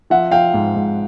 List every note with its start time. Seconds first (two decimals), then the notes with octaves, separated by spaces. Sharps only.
0.10 F3 E5 F#5
0.31 F3 F5 G5
0.54 G#2
0.76 G#2